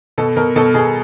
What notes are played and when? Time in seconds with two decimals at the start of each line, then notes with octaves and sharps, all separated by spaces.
0.18 B2 A4
0.36 B2 A#4
0.56 B2 A4
0.74 B2 G#4